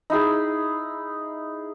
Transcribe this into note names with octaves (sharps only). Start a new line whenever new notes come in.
D#4 E4 G#4